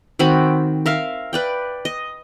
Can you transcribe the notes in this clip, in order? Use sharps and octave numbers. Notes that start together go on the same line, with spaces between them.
D#3 C4 F#4 B5
A#4 E5 F5
B4 D5 G5
D#5